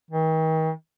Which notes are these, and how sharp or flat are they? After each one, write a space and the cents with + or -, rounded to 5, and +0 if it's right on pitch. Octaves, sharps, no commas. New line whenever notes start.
D#3 +40